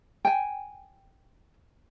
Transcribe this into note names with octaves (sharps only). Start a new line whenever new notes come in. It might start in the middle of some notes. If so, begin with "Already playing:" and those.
G5 G#5